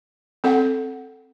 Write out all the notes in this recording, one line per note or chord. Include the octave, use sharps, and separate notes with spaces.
C4 A4 F#5